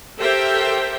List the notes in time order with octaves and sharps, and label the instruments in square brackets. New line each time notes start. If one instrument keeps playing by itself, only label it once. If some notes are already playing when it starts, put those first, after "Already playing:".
[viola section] G4 A4 A#4 C5 E5 G5